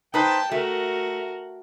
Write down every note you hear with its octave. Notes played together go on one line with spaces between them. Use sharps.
D#4 B4 C5 G5 A5
A3 F#4 A#4